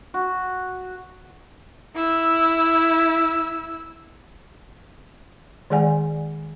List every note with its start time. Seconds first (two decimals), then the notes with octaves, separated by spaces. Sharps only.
0.14 F#4
1.95 E4 E6
5.70 D#3 G#3 G#4 D5 F#5 G#5